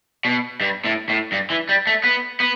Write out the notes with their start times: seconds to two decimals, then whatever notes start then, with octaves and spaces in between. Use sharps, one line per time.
0.25 B2
0.61 G2
0.85 A2
1.09 A2
1.32 G2
1.50 E3
1.69 G3
1.87 A3
2.04 B3
2.40 B3